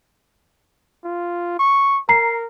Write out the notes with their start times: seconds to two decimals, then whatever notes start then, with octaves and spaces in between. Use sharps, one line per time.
1.04 F4
1.59 C#6
2.09 A#4 A#5 C7